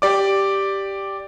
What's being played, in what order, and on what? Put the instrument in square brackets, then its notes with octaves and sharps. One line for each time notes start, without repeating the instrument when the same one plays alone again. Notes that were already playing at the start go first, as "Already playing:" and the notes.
[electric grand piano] G4 D5 D6